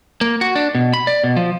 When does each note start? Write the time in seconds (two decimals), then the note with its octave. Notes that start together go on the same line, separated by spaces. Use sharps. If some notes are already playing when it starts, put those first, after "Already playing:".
0.21 A#3
0.41 F#4
0.56 D4
0.75 B2
0.94 B5
1.07 D5
1.24 B2
1.36 F3